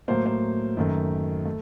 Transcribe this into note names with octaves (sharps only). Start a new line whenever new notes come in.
A2 F#3 A#3 C5
C5
F#2 D#3 A3
A3